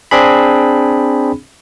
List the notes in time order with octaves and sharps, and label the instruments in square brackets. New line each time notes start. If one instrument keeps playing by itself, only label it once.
[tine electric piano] C4 D4 G#4 B5